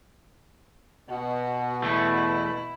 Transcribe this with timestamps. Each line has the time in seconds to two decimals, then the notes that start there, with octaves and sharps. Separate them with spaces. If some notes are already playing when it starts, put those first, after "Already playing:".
1.09 B2 F#4
1.82 E2 A3 E4